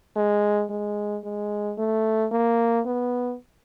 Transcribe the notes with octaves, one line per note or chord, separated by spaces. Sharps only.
G#3
G#3
G#3
A3
A#3
B3